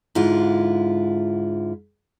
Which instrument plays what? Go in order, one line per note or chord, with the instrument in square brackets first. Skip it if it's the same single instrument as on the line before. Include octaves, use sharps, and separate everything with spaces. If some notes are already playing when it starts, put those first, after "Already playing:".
[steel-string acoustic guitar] G#2 D3 E4 F4